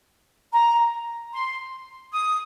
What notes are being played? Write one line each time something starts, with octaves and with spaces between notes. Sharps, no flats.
A#5
C6
D#6